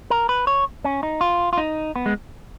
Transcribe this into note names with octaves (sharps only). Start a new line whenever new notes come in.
A#4
B4
C#5
C#4
D#4
F4
F4
D#4
B3
G#3